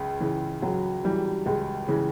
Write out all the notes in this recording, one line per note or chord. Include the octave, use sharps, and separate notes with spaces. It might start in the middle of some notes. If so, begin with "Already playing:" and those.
Already playing: C#2 C#3
C#3 E3
C#2 F#3
C#3 E3 G3
C#2 G#3
C#3 E3